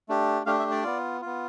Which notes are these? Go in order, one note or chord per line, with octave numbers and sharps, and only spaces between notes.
A3 D4 G4
A3 D4 G4 F5
E5
D5
B3 F4
B3 F4